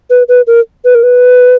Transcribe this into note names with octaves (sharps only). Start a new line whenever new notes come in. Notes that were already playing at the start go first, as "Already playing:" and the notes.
B4
B4
A#4
B4
A#4
B4